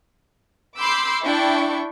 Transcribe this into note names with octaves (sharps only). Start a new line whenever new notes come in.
B5 C6 D6 E6 G6 C7
D4 E4 G5 C#6